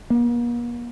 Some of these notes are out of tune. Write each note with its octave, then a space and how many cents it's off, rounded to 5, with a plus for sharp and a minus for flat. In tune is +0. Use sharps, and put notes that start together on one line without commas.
A#3 +45